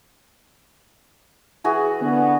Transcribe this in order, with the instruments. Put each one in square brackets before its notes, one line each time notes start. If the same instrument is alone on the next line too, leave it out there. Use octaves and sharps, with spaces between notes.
[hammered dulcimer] E3 F#4 G#4
[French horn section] D3 B3